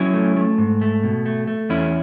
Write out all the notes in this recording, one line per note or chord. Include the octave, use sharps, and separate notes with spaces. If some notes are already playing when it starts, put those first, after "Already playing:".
Already playing: F#3 C#4 E4
A3
A3
G#2
A3
B2
A3
A3
E2 C#4 E4